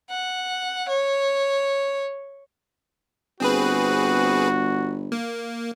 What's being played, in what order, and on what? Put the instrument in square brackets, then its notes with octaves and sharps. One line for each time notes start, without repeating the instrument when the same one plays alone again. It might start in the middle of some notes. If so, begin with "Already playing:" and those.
[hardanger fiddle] F#5
C#5
[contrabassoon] G1 [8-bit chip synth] C4 G#4 B4 [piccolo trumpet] F#4
[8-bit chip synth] A#3